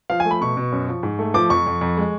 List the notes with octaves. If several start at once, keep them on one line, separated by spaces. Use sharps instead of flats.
F3 F5
G#5
A3
B5
B2 C#6
B2
F#2
F3
G#2
A3
F3 D6
F2 C#6
F2
F2
G#3